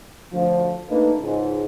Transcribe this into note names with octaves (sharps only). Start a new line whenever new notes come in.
D2 F3
A3 A#3 D4 D#4 B4
C#2 G#2 G#3